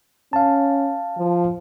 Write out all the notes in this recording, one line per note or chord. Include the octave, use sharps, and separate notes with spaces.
C#4 F5 A5
F3